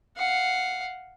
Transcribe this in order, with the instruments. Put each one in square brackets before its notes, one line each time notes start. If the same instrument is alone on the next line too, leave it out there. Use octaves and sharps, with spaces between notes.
[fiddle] F5 F#5